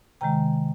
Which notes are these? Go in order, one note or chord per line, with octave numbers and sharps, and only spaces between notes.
C3 D#3 G#3 G5 A#5